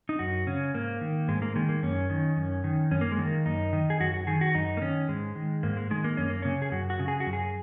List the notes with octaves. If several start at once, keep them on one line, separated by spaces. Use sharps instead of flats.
D#4
F#2 F#4
C#3 C#4
G#2 A#3
D#3
G#2 G#3
A#3
D#3 G#3
A#3
F#2 C#4
D#3
F#2
D#3
F#2 C#4
A#3
G#3
D#3 A#3
F#2 D#4
D#3
G#4
F#2 F#4
F#4
D#3 G#4
F#4
F#2 D#4
A#3
D#3 C#4
G#2 G#3
D#3
G#2 A#3
G#3
D#3 G#3
A#3
F#2 C#4
A#3
C#3 C#4
G#4
F#2 F#4
F#4
C#3
G#4
F#4
F#2
G#4